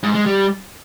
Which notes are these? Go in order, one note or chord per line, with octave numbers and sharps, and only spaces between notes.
G#2
G#3
G3